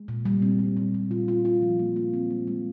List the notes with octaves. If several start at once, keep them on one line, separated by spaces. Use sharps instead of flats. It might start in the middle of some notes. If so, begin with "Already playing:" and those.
Already playing: G#3
A#2
G3
C4
G3
A#2
A#2
F4
F4
F4
F3
A#3
F4
C4
G#3
G#3